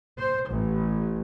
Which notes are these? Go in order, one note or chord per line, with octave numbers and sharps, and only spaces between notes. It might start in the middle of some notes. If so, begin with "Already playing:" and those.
C5
A1